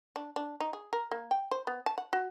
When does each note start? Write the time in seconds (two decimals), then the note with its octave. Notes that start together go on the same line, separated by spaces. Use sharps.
0.16 D4
0.36 D4
0.60 D#4
0.73 G#4
0.93 A#4
1.11 A#3
1.31 G5
1.51 C5
1.67 B3
1.86 A5
1.98 F#5
2.13 F#4